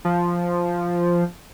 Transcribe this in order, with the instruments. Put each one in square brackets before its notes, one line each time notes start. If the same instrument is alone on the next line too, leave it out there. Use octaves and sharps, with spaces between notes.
[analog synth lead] F3